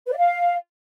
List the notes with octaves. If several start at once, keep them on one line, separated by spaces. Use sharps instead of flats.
B4
D5
F5